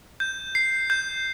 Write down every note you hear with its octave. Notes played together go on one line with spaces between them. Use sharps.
G6
C7
G6